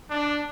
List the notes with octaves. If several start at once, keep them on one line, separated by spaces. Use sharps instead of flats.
D4